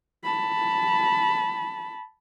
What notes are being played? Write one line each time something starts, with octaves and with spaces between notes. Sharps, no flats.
A5 B5